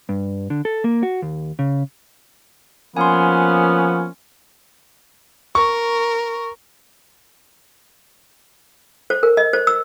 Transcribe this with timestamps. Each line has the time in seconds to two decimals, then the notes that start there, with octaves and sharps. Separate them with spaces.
0.09 G2
0.50 D3
0.65 A4
0.84 A#3
1.03 F#4
1.22 D#2
1.59 C#3
2.97 F3 A#3 B3 C#4 G#5 C6
5.55 A#4 C#6
9.10 C5
9.23 A#4
9.37 D#5
9.53 C5
9.67 E6